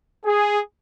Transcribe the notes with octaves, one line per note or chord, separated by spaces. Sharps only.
G#4